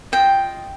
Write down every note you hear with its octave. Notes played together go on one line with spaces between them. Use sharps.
F4 D#5 G5